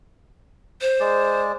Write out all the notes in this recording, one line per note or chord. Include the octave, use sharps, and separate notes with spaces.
C5
G#3 D5